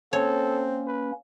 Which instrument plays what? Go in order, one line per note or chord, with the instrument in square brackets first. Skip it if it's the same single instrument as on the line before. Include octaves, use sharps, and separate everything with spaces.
[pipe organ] A#3 C#4 [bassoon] C4 [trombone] A4 [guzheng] C#5
[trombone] B4